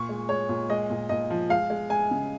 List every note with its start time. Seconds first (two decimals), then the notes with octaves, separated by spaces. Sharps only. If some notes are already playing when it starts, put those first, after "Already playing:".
Already playing: A#2 C#6
0.09 G#3
0.29 G#3 C#5
0.49 A#2
0.69 G#3 D#5
0.90 A#2
1.09 A#2 D#5
1.30 F3
1.49 G#3 F5
1.70 G#3
1.90 G#3 G#5
2.11 C#3